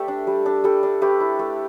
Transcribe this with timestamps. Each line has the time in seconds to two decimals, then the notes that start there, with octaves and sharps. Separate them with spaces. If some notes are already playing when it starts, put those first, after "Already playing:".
Already playing: A3 G4 A4 B4 D5 E5 G5
0.08 D4
0.27 G3
0.46 D4
0.64 G3 A4
0.83 D4
1.01 A3 G4 B4
1.20 E4
1.39 A3